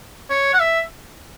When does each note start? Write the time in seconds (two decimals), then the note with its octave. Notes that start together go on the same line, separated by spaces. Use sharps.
0.30 C#5
0.53 F#5
0.60 E5